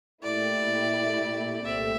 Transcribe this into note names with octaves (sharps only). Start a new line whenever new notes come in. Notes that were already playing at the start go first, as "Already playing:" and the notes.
A#2 A3 E4 G4 D5
C2 A#2 A3 C4 G4 E5